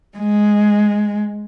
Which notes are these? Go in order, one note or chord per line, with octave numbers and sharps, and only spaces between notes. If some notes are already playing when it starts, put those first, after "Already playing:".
G#3